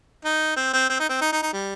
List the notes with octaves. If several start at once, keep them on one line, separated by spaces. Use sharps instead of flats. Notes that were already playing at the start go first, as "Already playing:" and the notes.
D#4
C4
C4
C4
D#4
C4
D#4
D#4
D#4
G3